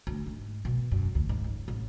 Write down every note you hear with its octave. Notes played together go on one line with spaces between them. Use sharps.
D2
G#2
B2
F#2
D2
G#2
C#2
A1